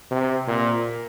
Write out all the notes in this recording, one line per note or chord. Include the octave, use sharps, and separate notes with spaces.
C3
A#2